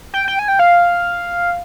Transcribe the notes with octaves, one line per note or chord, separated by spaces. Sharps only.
G5
G5
G#5
G5
F5